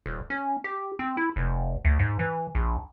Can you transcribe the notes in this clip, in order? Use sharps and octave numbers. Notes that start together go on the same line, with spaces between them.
D#1
C#4
G4
C4
E4
F1
D2
G#2
E3
A#1